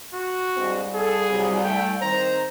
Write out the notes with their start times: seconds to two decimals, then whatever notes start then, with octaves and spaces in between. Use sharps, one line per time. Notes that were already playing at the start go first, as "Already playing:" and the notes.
0.13 F#4
0.57 C2 G2 G#3 C4
0.94 G#4 A4
1.30 C3 F#3 G3
1.64 A3 G5
2.02 D#3 C4 C5 A#5